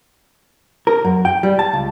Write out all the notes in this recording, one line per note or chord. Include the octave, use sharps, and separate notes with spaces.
A#4
F#2
G5
G3
A5
C#2